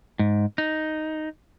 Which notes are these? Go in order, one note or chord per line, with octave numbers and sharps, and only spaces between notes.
G#2
D#4